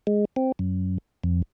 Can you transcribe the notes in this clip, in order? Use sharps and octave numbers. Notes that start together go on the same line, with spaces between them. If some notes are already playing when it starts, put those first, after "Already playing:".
G#3
C4
F#2
F2